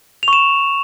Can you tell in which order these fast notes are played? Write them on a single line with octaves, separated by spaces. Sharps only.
F7 C#6 E7